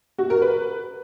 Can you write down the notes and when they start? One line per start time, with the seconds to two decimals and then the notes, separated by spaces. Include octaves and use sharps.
0.18 F#4
0.30 A#4
0.42 B4